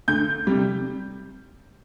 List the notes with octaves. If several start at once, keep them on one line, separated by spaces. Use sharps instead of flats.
D2 G6
C3 G3